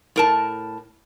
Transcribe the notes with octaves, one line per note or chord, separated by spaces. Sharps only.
A2 A#4 A5